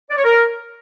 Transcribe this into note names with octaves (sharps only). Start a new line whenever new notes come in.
D5
C#5
A#4